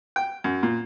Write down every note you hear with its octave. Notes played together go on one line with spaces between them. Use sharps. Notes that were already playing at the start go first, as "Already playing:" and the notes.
G5
F#2
A#2